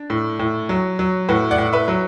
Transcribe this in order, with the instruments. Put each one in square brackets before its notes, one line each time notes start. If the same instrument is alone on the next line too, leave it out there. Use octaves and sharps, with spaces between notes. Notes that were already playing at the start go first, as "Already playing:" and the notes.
Already playing: [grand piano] D4
A2
A2
F#3
F#3
A2 F#4 B4
D5 F#5
A2
B4 E5
F#3